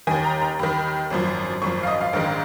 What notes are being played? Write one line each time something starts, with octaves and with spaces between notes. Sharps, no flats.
D#2 D#3 G#5
A#5
A#5
D#2 D#3 B5
G#1 F#2 F3
G#1 F#2 F3 C#6
F5
D#5
F5
A#1 G#2 D#3